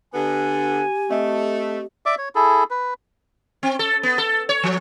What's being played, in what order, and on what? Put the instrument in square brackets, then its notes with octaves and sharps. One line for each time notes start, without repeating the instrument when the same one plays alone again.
[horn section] D3 B3 [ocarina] G4 [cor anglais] G#5
[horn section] A3 [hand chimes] C4 D#5 E5
[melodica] D5 E5 D6
C#5
E4 G#4 A4
B4
[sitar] C4
A4
B3
A4
C#5
F3